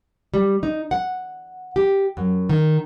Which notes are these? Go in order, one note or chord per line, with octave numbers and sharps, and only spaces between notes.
G3
D#4
F#5
G4
F#2
D#3